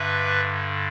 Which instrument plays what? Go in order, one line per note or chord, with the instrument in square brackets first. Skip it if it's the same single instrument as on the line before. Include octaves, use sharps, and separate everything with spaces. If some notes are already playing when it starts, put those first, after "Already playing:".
Already playing: [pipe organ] G2 D3 B4 E5